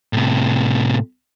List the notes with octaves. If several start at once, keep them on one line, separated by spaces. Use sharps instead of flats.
A2 C3